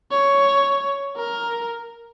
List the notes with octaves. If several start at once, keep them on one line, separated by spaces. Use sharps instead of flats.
C#5
A#4